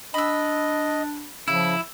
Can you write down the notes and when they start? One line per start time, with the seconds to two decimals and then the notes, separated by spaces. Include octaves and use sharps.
0.14 D4 D#5 B5 E6
1.48 C#3 F3 E4 E6